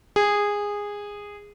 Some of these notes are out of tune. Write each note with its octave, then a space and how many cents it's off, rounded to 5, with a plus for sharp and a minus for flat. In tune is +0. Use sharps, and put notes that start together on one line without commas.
G#4 -15